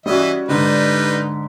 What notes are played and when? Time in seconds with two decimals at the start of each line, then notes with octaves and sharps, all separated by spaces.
0.06 E3 G3 C#4 F#4 D#5 E5
0.48 G#2 D3 G3 D#4 B4